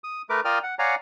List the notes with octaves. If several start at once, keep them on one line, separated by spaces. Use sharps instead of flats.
D#6
A3 A#4 B4 D6
F4 A#4 D5 G5 D#6 F6
F#5
C#5 D5 F5 F#5 G#5 A#5